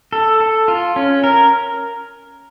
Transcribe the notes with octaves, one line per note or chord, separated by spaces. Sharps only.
A4
A4
F4
C#4
A#4